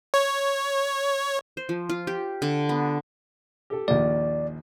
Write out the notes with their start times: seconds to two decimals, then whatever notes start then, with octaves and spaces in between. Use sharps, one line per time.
0.14 C#5
1.57 C5
1.69 F3
1.89 F4
2.07 G4
2.42 D3
2.69 B3
3.70 G4 A4
3.88 A#1 D#2 D5